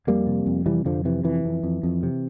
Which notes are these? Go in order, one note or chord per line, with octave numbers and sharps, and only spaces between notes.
F2 G3 A#3
C3
F2
C3 E3 G3
F2 D3 F3
C3 E3
F2 E3
F2
F2
F2
C3